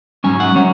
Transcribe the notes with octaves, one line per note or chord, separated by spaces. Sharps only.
G#2 F#3 C#4 G#5
F#5
F#3 C#4 C#5